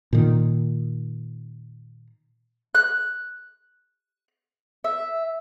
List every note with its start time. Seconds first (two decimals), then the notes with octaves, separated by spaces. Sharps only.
0.13 A#2 D#3
2.75 F#6
4.84 E5